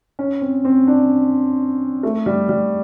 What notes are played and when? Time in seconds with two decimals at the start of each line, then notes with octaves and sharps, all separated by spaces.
0.19 C#4
0.41 C4
0.65 C4
0.87 D4
2.03 A3
2.26 G3
2.49 G3